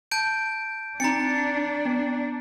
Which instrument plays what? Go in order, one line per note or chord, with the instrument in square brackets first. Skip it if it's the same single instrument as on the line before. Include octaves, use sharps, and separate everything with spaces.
[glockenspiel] A5 G6 D7
[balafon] C4 D#4 [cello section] D4 [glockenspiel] A#5 A6 C#7
[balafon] B3